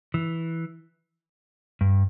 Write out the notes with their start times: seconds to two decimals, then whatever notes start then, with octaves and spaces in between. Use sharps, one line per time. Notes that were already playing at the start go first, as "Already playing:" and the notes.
0.14 E3
1.81 G2